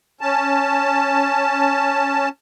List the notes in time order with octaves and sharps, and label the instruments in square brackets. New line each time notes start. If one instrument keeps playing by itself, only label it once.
[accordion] C#4 A5